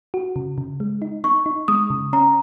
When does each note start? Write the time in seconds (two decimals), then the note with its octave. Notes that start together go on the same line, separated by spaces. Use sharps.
0.14 F#4
0.36 C#3
0.58 C#3
0.80 G#3
1.02 D#4
1.24 D#4 C#6
1.46 D#4
1.68 G#3 D#6
1.90 C#3
2.13 C#4 A#5